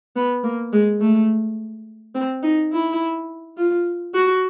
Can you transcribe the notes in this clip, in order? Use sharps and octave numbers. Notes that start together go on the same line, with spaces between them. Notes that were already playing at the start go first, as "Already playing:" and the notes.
B3
A#3
G#3
A3
C4
D#4
E4
F4
F#4